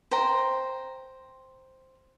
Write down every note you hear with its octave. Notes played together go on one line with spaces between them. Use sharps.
C5 G5 A#5